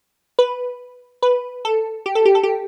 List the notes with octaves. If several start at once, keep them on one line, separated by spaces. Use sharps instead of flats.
B4
B4
A4
G4
A4
G4
A4
G4